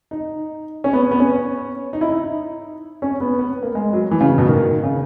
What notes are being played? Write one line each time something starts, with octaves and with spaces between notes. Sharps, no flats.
D#4
C#4
B3
B3
C#4
D#4
E4
D#4
C#4
B3
B3
A#3
G#3
F#3
E3
C#3
B2
D#3
C#3